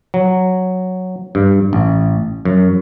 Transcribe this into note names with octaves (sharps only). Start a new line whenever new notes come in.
F#3
G2
A1
F#2